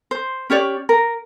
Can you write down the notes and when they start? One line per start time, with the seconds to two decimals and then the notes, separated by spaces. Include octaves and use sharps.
0.11 C5
0.50 C#4 G4 C#5 D5
0.89 A#4